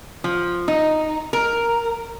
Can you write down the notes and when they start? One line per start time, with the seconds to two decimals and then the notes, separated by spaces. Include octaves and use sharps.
0.24 F3
0.68 D#4
1.33 A#4